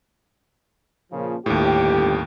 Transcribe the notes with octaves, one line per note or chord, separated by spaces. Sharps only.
A#2 C#3 F3
G1 D#2 A2 G4